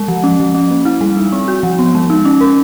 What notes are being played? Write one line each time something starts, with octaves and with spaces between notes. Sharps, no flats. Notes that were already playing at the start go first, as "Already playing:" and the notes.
Already playing: G#3
F3
C#4
F3
C#4
A#3
E4
G3
D#4
C4
F#4
F3
B3
G#3
D#4
C#4
A#4